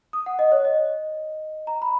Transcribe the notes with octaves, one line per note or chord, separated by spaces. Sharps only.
D#6
F#5
D#5
C#5
D#5
A#5
B5